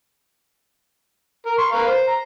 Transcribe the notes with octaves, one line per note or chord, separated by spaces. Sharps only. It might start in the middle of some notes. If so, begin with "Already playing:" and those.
A#4
C6 C#6
A#4 B4 F5
C5
A#5